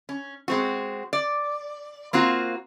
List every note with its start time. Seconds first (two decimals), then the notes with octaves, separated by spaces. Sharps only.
0.09 C#4
0.48 G#3 C4 F#4
1.13 D5
2.13 A#3 C4 F4 F#4